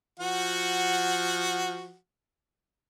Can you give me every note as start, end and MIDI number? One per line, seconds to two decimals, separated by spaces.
0.20 1.95 53
0.20 1.95 66
0.20 1.95 78